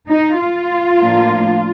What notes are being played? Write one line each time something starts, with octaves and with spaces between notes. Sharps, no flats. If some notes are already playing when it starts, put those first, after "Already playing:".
D#4
F4
A2 F3 A#3 D4